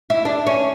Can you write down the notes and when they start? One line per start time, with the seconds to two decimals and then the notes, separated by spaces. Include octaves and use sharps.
0.10 E4
0.25 D4
0.47 C#4